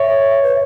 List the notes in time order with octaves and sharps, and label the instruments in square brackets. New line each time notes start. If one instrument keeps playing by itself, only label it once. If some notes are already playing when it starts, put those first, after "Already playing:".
Already playing: [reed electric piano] C#5 [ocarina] E5
[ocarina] B4